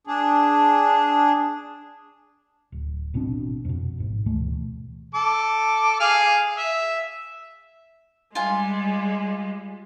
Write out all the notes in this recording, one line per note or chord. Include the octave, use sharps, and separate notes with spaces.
D4 G#4
D1
A1 B2 C4 D4
F2 B2
A1 G#2
D2 B2 E3 A3
A4 D6
G#4 F5 F6
E5
G3 G#3 F4 G#5